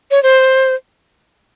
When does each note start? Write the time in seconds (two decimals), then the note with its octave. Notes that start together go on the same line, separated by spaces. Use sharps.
0.11 C#5
0.23 C5